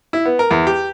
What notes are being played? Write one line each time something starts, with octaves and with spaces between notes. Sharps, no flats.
E4
B3
A#4
E2
G4